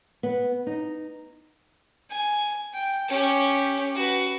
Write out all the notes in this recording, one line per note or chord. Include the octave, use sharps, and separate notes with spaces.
B3
D#4
G#5
G5
C#4 G4
F#4 B4